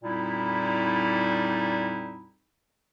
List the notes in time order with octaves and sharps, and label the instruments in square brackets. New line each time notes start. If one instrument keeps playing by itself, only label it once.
[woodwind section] F2 A#2 G3 D#4 E4